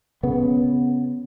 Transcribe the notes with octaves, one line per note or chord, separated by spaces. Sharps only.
C#3 B3